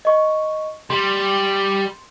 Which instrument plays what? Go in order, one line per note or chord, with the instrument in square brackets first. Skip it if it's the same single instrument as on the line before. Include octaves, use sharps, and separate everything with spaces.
[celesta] D#5 C#6
[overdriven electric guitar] G3 [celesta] C6